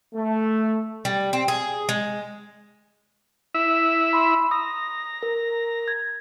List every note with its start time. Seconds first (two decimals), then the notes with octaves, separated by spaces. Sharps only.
0.15 A3
1.05 G3
1.33 C4
1.48 G#4
1.89 G#3
3.55 E4 E5
4.13 B5 C6
4.51 A#5 D#6
5.23 A#4
5.88 G#6